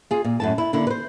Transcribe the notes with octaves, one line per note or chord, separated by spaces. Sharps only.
F4 G#4
A#2
F#2 A2 A5
E4
D3 A#3 E4
B4 C5